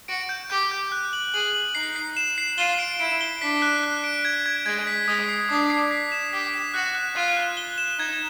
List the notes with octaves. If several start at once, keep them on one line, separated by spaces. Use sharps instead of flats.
F#4 D7
G6
G4 G6
G6
F#6
F#7
G#4 F#7
F#7
D#4 C7
C7
E7
C7
F4 G7
D7
E4 D7
G7
D4 B6
F#6
F#6
D7
G#6
G#6
G#3 G#6
B6
G#3 D#6
C7
D4 D#6
C7
B6
E7
G4 B6
E7
F#4 F#6
F#6
F4 F#6
F#6
G7
E7
D#4 G#6